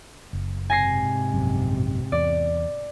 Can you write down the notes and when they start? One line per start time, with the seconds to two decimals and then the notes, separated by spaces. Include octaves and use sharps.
0.33 F#1
0.70 G#2 C3 G#5 A#6 C7
1.33 A#1 F#2
2.12 E2 D5